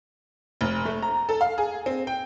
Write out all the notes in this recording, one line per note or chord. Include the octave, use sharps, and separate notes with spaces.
F1
A3
A#5
A4
F5
G#4
C4
G5